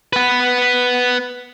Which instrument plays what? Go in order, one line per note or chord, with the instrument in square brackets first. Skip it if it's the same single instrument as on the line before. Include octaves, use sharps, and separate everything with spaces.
[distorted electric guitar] B3 B4